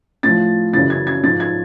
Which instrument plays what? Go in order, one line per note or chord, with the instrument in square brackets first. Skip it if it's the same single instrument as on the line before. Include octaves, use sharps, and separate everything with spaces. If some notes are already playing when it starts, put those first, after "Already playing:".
[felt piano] A2 F3 A6
F#2 C#3 E3 A6
G#6
G#6
G#2 F3 A6
G#6